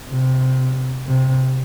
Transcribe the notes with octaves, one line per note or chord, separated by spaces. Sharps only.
C3
C3